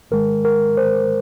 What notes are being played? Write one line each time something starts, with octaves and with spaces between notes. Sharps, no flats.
G#2 D#3 G#3 A#4
A#4
C5